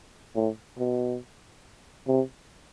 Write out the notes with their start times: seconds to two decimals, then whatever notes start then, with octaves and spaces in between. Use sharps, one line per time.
0.35 A2
0.79 B2
2.08 C3